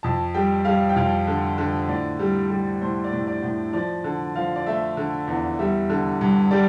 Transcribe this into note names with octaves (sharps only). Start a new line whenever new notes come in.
F2 A5
G3 G5
G3 F5
G5
F2 F5
D3
D3
A2 D5
G3
G3
A2 C5
D5
A2
D5
A2
F3 D5
D3
F3 F5
D5
A3 E5
D3
E2
G3 E5
D3
G2
G3 D5